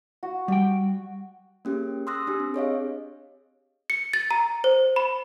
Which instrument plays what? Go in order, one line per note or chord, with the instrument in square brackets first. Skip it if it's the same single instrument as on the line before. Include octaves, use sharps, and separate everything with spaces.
[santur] F#4
[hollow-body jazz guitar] G3 G5
[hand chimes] A#3 C#4 G4 G#4
C6 D#6 E6 F#6 A#6
D4 G4
C4
G#4 C#5 D#5 F5
[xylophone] C#7
A6
A#5
C5
B5